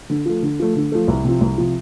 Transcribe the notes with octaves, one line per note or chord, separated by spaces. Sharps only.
D3
F3 A3
D3
F3 A3
D3
F3 A3
C2
C3 F3
C2
C3 F3